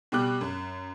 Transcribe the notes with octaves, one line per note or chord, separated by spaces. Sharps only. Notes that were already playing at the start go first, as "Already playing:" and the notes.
B2 G3 D6 F#6
F#2